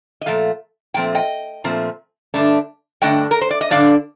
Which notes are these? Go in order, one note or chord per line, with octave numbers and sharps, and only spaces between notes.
D#5
A#2 F3 A3 F5
A#2 F3 A3 C4 G5
D#5 G5
A#2 F3 A3 C4
G2 D3 A3 D4
G2 D3 A3 D4 D#5 G5
A#4
C5
D5
D#5
G2 D3 A3 D4 D5 F5